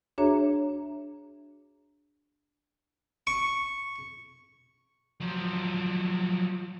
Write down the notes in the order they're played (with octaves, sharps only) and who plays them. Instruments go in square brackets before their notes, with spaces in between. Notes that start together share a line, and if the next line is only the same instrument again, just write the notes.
[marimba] D4 F#4 G#4 C#5 E5 A#5
[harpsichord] C#6
[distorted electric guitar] F3 F#3